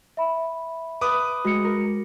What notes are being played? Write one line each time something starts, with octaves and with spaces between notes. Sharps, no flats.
E5 B5
B4 D6 D#6
G#3 F#4 C#7
A#4